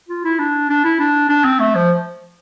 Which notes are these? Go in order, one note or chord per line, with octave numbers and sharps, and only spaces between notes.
F4
E4
D4
D4
E4
D4
D4
C4
A3
F3